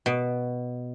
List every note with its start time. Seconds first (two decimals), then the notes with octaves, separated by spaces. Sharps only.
0.06 B2